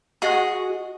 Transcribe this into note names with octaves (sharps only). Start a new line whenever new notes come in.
F#4 G#4 D#5 F#5